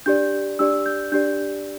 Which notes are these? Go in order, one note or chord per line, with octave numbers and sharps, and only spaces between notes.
D4 G4 D5 G6
D4 G4 D5 E6
G6
D4 G4 D5 G6